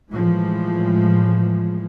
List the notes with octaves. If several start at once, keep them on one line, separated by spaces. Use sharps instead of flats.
A2 E3 F3 G#3